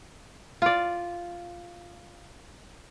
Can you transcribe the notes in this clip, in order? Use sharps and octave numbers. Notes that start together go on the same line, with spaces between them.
F4 D5